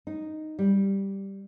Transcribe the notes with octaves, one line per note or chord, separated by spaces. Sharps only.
D#4
G3